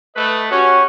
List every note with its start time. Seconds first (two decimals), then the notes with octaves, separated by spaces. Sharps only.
0.16 A3 B4 D#5
0.51 C#4 F#4 G4 C#5